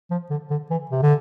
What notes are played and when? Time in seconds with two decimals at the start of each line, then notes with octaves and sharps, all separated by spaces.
0.11 F3
0.30 D3
0.51 D3
0.70 E3
0.91 C3
1.03 D3